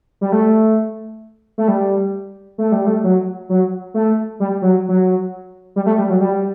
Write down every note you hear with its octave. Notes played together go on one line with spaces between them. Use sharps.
G3
A3
A3
G3
A3
G3
A3
F#3
F#3
A3
G3
F#3
F#3
G3
A3
G3
F#3
G3